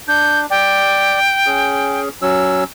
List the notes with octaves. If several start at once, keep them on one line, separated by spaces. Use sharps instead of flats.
D4 G6
D5 G5
C#4 G#4
F#3 C#4 E6